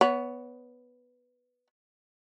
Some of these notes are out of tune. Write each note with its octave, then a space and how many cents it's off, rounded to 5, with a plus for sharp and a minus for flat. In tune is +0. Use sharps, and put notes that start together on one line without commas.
B3 +0 C#5 +20